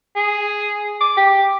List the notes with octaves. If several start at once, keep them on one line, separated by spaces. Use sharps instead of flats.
G#4
D6
G4